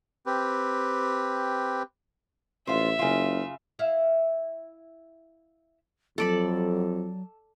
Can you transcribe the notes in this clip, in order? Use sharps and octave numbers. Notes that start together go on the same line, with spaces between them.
C4 G4 B4
A1 F4 C5 E5
F#1 C#3 F4
E4 E5 F5
F2 F#3 A4 D5 B5